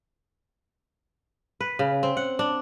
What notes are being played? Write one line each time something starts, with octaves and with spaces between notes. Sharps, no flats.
B4
C#3
C4
F#5
D4